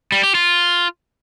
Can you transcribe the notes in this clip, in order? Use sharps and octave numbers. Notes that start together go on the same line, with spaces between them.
G3
G4
F4